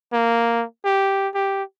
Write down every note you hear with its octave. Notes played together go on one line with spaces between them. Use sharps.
A#3
G4
G4